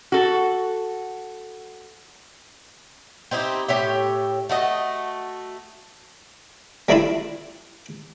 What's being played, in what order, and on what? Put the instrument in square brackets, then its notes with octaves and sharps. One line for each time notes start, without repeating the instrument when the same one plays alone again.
[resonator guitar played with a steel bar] F#4 A4
[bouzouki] C4 D#4 E4 G4
A2 G4 C#5 E5
A3 F#4 D#5
[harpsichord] G3 A3 D4 E4 F4